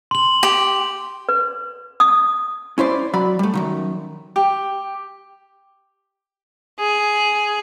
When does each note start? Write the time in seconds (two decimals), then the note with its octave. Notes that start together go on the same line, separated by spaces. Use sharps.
0.11 C6 F#7
0.43 G4
1.29 B4
2.00 D#6
2.78 C#4 E4 C5 D5
3.14 F#3 D5 B5
3.39 G3 A3
3.54 F#2 B2 D#3
4.36 G4
6.80 G#4